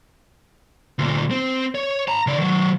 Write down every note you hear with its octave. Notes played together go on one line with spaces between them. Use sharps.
D2 A#2
C4
C#5
A5 A#5
C#3 D5
D#3 F#3